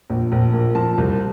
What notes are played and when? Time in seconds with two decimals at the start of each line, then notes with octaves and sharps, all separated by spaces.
0.10 A#1
0.32 A#1
0.53 A#2
0.75 F3 A5
0.98 C2